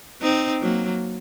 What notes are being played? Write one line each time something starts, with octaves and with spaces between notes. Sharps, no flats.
C4 D#4
F#3 A#3